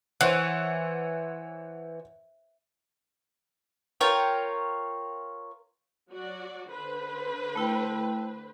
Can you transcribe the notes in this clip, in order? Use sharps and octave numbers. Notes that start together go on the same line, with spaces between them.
E3 C5 C#5 F#5
F4 A#4 C#5 G5
F#3 F#4 D5
D3 B4 C5
A3 E4 G5